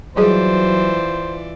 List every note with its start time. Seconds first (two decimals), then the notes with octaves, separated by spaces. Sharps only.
0.17 E3 F#3 G3 F4 G#4 C5 D5 D#5